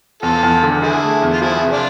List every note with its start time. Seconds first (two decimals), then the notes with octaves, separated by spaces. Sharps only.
0.22 E2 F4 A4
0.43 E2
0.63 D3
0.82 D3 E4 G#4
1.02 A3
1.22 E2
1.33 F4
1.42 F3 E4 G#4
1.62 C3
1.72 D4 F4